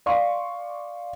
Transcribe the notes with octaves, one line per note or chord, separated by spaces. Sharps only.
D5 F5 C6 C#6